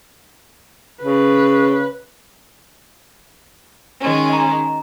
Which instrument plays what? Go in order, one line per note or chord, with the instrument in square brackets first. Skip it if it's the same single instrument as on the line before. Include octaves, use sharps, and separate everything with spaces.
[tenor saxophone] C#3 [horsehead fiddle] B4
[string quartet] D#3 G#3 C#4
[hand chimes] D#5 A#5